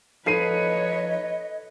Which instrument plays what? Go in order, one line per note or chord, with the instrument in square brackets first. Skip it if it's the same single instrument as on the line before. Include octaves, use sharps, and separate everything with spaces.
[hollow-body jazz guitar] F3 D#4 [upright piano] A4 C7 D#7 [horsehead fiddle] B4 C#5 [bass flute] D#5